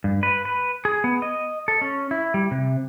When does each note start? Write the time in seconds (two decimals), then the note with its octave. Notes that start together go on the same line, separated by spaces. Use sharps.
0.04 G2
0.23 B4
0.45 B4
0.85 G#4
1.04 B3
1.22 D#5
1.68 A4
1.82 C#4
2.11 E4
2.34 G3
2.51 C3